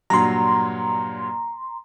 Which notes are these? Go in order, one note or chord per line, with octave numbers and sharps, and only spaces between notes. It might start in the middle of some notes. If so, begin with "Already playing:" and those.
G2 A#2 F#3 A#5 C6